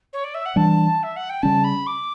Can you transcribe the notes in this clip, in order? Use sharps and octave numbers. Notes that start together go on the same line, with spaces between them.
C#5
D5
E5
F#5
E3 G3 D4 A5
E5
F#5
G5
C#3 G3 C#4 A5
B5
D6